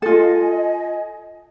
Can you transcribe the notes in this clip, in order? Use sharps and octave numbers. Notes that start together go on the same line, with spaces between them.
F4 A4 D#5 G#5